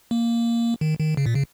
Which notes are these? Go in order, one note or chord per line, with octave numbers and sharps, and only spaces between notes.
A#3
D#3
D#3
C#3
A#2
C#3